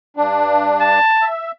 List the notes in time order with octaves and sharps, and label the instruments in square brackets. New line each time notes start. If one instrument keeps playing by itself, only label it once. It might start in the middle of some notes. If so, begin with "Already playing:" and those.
[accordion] G2 D4
[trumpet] A5
[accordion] E5